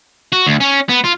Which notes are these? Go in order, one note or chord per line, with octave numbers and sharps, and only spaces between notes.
F#4
D2
C#4
B3
F4